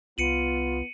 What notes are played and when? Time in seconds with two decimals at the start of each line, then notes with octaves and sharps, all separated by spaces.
0.18 C2 B3 F4 C#7 D#7 F#7